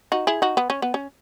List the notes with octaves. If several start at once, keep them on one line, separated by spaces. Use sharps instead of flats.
D#4 F#4
E4 G#4
D#4 F#4
B3
C#4
B3
C#4